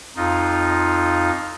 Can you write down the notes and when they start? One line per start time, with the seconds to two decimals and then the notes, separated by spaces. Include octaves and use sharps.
0.16 F2 D#4 F4